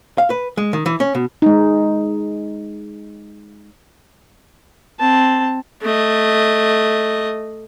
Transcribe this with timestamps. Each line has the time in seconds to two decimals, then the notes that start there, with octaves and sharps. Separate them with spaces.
0.18 F5
0.30 B4
0.57 G#3
0.73 D#3
0.86 E3
1.00 C#4
1.15 B2
1.42 G#3 D#4
4.99 C4 A5
5.82 A3 D#5